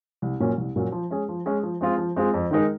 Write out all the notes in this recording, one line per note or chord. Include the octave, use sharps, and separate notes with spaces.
C2
A#2 F#3 A#3 C#4
C2
A#2 F#3 A#3 C#4
F3
G#3 C#4 G#4
F3
G#3 C#4 G#4
F3
G#3 C4 F4 G#4
F3
G#3 C4 F4 G#4
F2
D#3 G#3 D#4 A#4